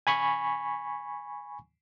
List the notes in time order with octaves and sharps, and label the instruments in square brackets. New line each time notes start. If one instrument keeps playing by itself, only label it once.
[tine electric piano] G#5 B5 C#6